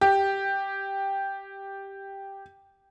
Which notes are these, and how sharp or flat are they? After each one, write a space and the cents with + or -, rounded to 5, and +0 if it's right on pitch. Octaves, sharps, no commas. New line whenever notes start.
G4 +0